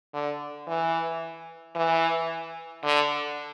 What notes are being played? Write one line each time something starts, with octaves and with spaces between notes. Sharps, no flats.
D3
E3
E3
D3